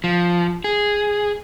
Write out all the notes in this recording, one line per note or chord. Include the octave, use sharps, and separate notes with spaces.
F3
G#4